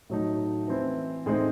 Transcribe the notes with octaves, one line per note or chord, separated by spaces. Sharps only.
A2 F#3 A3 D#4
E3 C4 E4
A2 G#3 C4 D#4